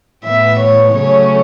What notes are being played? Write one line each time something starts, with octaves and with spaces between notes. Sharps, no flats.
A2 E3 B3 E5
C#5
C#3 F#3 A3 C#4 C#5